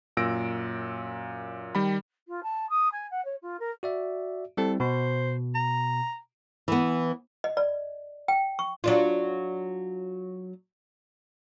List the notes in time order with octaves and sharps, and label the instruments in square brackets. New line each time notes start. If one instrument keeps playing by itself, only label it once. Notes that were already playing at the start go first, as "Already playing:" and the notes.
[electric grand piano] F#2 A#2 E6 A#6 D7
D#3 G3 G5 B5
[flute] F4
A5
D#6
G#5
F#5
C#5
F4
A#4
[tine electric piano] F#4 D5 E5
[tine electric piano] G3 C4 E4 [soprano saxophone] A4
[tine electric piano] B2 [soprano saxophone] C5
[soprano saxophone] A#5
[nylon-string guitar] E3 B3
[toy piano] D#5
D5
G5
C#6
[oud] F#3 D4 F4